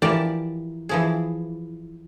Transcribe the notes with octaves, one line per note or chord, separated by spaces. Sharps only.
E3 F3 G4 A#4 D5 A5
E3 F3 G#4